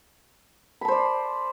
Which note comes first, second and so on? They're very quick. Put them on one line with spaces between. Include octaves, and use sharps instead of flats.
B5 A5 C5 D5